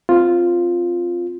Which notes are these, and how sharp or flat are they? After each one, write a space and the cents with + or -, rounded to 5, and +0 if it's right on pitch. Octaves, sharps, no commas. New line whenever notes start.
C4 +0 F4 +0